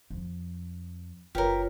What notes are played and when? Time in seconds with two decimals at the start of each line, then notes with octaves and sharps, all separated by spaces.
0.10 F2
1.35 F#1 F4 G4 A#4 B4 C#5